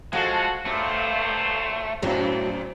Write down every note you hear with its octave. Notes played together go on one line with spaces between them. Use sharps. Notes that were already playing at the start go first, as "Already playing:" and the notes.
F3 G#3 F#4 A4 F5
G2 A#2 F#3 A3 C5
F#2 A2 E3 F#3 C4 F#4